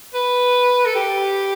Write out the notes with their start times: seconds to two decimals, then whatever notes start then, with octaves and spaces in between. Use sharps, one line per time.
0.14 B4
0.85 A4
0.95 G4